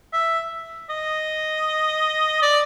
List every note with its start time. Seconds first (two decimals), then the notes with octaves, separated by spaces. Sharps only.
0.13 E5
0.90 D#5
2.42 D5